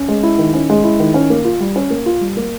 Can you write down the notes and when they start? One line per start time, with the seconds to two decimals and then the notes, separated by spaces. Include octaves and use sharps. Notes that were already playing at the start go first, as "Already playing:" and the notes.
Already playing: C#4
0.08 G#3
0.23 E4
0.38 D#3
0.54 C#4
0.70 G#3
0.84 E4
0.99 D#3
1.14 C#4
1.30 A#3
1.45 F4
1.60 G3
1.76 C#4
1.90 A#3
2.06 F4
2.21 G3
2.37 A#3